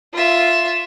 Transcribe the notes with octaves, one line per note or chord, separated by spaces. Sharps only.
F4 E5